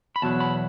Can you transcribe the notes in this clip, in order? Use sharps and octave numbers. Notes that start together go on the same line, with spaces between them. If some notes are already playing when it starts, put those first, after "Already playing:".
B5
E2 B2 F#3 A5
B5